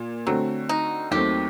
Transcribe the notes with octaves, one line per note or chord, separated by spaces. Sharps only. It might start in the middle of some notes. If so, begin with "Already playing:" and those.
Already playing: A#2
D3 F#3 A3 C4 F#4
D#4
D#2 D#3 F#3 A3 C4 G4